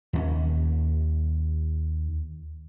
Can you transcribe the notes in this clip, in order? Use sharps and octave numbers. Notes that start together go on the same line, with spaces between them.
D#2 G3 C#4